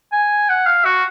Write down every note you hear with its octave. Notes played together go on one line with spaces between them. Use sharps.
G#5
F#5
F5
F#4